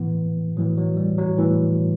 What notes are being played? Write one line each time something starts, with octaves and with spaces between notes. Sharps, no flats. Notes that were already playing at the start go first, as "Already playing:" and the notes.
Already playing: A2 E3 B3
A2 E3 F#3
F#3
G3
F#3
A2 E3